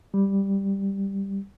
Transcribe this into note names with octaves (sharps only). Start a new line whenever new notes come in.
G3